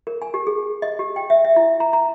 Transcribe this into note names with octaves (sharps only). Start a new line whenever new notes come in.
A#4
G#5
G4
G#4
D#5
G4
G5
E5
E5
E4
A#5
A#5